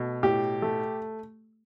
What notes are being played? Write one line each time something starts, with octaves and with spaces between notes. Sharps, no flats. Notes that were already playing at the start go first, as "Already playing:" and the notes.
Already playing: B2 A3
A2 G4
A3